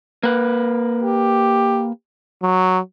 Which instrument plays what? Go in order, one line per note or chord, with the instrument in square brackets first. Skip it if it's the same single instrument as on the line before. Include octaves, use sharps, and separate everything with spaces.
[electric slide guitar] A#3 B4
[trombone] G4
F#3